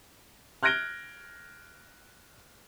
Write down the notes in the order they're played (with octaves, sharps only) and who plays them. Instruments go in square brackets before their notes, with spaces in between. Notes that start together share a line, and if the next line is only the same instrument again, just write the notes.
[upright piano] F6 F#6 G#6 A#6 D7 G7